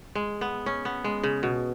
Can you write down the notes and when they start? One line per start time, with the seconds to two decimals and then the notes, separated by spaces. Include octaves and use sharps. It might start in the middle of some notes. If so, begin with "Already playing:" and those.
0.15 G#3
0.41 B3
0.66 C#4
0.85 B3
1.04 G#3
1.23 C#3
1.43 B2